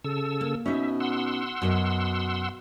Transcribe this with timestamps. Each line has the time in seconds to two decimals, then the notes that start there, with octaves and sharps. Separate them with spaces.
0.04 C#3 A4 E6
0.41 A#3
0.66 B2 C#4 D#4 E5
1.00 F#5 C6 E6
1.62 F#2 B2 D#5 E5